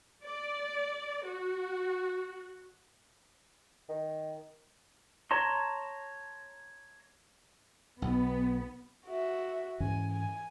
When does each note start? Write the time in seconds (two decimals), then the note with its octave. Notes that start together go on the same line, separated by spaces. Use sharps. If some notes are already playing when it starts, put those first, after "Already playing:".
0.24 D5
1.25 F#4
3.89 D#3
5.31 C#5 A5 A#5 C6
8.02 B1 B3
9.06 F#4 E5
9.80 G#2 E3 C#4 G#5
10.11 G#5